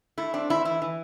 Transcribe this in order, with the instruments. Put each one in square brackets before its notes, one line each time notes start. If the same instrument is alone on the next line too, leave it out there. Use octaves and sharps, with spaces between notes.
[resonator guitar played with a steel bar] A3 E4
C4 D4
A3 E4
E3 E4
E3